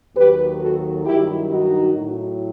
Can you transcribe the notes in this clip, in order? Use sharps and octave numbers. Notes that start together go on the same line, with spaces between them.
D#2 D#3 F#3 G4 B4
F#4 A4
G2 D#3 F#3 E4 G4
D#4 F#4
A2 F#3